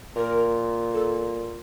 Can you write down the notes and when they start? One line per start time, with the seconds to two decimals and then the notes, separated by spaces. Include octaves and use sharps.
0.16 A#2 A#4
0.94 A4